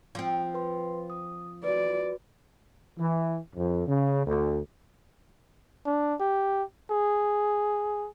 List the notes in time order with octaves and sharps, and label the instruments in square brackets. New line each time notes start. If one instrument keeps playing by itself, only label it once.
[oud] F3 C4
[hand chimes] B4 C6
D#6
[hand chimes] F#4 B4 [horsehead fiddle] D5
[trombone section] E3
F2
C#3
D2
[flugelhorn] D4
G4
G#4